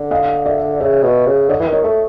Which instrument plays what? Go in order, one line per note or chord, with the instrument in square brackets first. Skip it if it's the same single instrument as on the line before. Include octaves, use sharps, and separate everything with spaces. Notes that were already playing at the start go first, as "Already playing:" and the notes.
Already playing: [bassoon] D3
[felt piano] D#5 F5
D5 E5
[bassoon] C#3 [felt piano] D5 E5
[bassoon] B2
C#3
[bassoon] D3 [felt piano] C#5 D#5
[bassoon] E3
D#3
[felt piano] C#5 D#5
[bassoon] A3